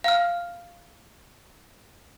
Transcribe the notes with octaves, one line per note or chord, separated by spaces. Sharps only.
F5 F6